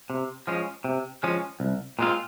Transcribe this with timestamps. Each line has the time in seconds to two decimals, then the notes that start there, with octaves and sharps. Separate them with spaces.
0.10 C3
0.47 F3 G#3 C#4
0.84 C3
1.23 F3 G#3 C#4
1.60 C2
1.99 A#2 G#3 C4 F4